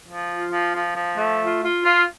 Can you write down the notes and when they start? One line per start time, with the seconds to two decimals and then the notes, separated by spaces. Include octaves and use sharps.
0.06 F3
0.28 F4
0.50 F3
0.74 F3
0.95 F3
1.18 A3
1.41 F4
1.63 F4
1.85 F4